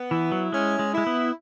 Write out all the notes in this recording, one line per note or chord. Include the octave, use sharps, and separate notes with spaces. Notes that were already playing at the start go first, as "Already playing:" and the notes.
Already playing: B3
E3 E4
F#3
G#3 C#4
G#3
G#3 E4
B3